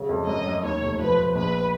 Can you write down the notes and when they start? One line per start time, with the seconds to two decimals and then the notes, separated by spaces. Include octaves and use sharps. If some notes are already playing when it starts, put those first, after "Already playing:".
Already playing: C#3 F#3
0.09 F2
0.27 F#2 D#5
0.45 F#2
0.63 D#2 C#5
0.81 F1
0.99 F3 B4
1.17 F3
1.35 A#1 B4